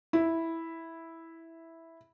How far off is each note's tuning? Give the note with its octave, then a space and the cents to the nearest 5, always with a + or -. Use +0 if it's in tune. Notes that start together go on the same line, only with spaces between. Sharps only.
E4 -5